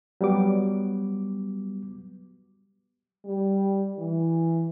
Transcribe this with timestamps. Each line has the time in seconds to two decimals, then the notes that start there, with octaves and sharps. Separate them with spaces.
0.21 F#3 G3 B3 D6
3.25 G3
3.98 E3